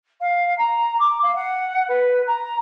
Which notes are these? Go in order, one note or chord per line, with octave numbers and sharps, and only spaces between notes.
F5
A#5
D6
F5
F#5
B4
A#5